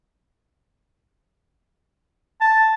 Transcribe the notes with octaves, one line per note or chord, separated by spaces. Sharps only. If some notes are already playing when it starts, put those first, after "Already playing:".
A5